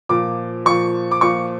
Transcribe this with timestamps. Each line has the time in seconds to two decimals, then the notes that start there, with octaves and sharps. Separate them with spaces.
0.09 A#2 F3 D6
0.65 A#2 F3 C#6
1.11 D6
1.21 A#2 F3 C#6